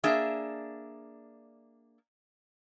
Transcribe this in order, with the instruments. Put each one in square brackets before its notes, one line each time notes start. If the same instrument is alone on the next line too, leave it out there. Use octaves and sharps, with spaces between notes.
[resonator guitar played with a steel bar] A#3 D4 G#4 E5